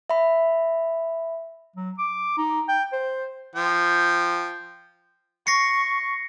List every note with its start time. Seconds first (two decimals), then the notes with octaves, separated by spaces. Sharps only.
0.10 E5 B5
1.76 F#3
1.98 D6
2.38 D#4
2.68 G5
2.93 C5
3.56 F3 G5
5.47 C#6 A#6 C7 C#7